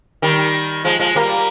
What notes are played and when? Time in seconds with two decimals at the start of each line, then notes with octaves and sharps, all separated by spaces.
0.22 D#3 G3
0.85 F3 G#3
0.99 F3 G#3
1.16 G3 A#3